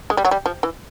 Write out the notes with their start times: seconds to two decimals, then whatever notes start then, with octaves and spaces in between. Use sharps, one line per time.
0.10 G#3
0.17 G3
0.25 F#3
0.31 G3
0.46 F3
0.63 E3